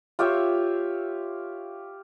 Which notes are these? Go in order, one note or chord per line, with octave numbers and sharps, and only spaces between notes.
F4 G4 C#5 E5